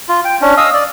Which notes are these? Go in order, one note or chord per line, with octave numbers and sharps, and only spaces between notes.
F4
G5
C#4 D4
D#5 F5 D#6 E6
D5